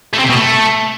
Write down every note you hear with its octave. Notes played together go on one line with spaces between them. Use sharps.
A3
C4
C3
B2
A3